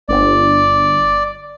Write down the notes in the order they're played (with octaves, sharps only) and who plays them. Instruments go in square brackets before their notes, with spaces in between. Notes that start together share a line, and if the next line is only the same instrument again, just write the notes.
[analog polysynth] G1 [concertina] D5